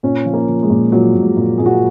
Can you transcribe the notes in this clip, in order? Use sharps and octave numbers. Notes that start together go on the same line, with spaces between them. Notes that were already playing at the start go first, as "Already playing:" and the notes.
A#2 C#4
F3
A#3
F3
G#3
A#2
A#2 F#3
A#2
G#3
A#2
A#2 G#4
F#4
F4